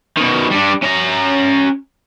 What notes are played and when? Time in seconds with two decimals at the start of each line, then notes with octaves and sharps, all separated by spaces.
0.17 B2 D#3
0.51 G3 D4
0.83 C#4 A#5